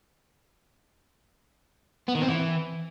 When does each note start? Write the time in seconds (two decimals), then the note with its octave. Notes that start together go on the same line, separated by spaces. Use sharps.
2.08 B3
2.15 D#3
2.22 C4
2.29 E3